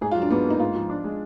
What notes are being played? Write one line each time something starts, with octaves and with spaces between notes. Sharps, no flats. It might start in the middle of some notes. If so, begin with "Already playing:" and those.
G#2 G#4
F4
F#3
D4
G#2 B3
A#3 D#4
G#2 F4
F3
D4
G#3